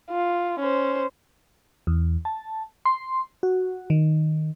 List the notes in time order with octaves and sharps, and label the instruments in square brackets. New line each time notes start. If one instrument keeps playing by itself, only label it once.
[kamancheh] F4
C#4 C5
[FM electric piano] E2
A5
C6
F#4
D#3